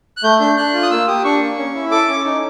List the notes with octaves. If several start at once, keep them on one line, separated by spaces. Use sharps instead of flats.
F#6
A3 G6
D4 G6
D4 F#6
F4
D#6
A#3 E6
G4 D#6
D4 C#6
A#3
C#4
E4
A4 D6
C#4
D#4